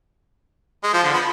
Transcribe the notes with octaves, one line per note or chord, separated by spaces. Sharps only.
G#3
F3
D3
B3